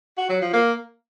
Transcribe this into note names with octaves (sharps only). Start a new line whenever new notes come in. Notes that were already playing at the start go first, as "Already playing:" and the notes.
F#4
F#3
F3
A#3